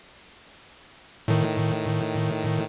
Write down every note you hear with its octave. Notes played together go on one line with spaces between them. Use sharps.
A2 D#3